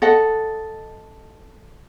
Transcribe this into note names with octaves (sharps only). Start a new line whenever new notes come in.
A4 D#5 F#5